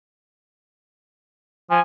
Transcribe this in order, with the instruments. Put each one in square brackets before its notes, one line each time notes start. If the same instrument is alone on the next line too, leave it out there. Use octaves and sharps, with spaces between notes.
[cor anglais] F3 [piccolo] G#5